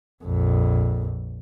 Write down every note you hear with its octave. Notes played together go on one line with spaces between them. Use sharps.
A#1 F2